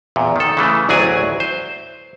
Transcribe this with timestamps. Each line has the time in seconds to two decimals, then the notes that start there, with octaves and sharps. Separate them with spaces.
0.16 E2 A#2
0.36 D#3 A4
0.57 C#3 E3 A3
0.89 A1 D2 F#3 G#4 D5 G#5
1.40 C5